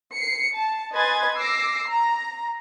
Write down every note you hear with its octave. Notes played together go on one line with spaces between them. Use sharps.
C7 C#7
A5
B4 D#5 G#5 C6 G#6 A6
D6 E6 A#6 C7
A#5